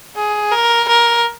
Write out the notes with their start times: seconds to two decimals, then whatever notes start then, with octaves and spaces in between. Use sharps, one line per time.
0.16 G#4
0.52 A#4
0.88 A#4